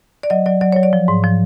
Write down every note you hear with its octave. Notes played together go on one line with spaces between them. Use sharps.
D5
F#3 D#5
F#3 D5
F#3 D5
F#3 C#5
D5
F3
G#2
F3